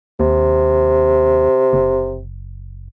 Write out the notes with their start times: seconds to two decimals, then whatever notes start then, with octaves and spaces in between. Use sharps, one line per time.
0.20 D#2 C3
1.73 F#1